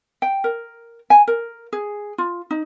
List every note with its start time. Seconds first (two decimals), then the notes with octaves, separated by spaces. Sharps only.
0.22 G5
0.44 A#4
1.10 G#5
1.28 A#4
1.73 G#4
2.18 F4
2.51 D#4